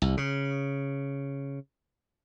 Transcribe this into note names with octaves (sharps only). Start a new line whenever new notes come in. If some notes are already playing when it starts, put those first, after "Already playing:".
C2
C#3